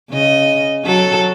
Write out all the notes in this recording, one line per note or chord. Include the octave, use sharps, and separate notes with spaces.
C#3 D#5
F#3 A4